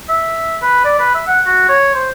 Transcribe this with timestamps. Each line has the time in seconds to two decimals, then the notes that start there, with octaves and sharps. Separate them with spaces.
0.09 E5
0.62 B4
0.85 D5
0.99 B4
1.14 E5
1.27 F#5
1.46 F#4
1.69 C#5
1.95 C5